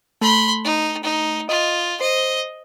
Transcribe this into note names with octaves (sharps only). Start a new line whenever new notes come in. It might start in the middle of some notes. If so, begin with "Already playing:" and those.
A3 B5 C6
D#4
D#4
F4 D#5
C5 D#5